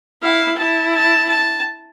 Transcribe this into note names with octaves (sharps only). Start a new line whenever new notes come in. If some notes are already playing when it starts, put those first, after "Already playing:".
E4 F5
E4 A5
A5
A5